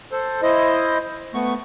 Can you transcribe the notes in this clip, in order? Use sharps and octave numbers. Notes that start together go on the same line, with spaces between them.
A4 C5
E4 C5 D#5
A3 B3 C#6